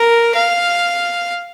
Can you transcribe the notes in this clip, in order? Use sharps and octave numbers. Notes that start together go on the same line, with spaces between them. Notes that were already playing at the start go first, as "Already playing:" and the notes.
Already playing: A#4
F5